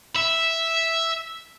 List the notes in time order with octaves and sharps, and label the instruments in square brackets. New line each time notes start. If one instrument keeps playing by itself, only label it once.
[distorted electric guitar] E5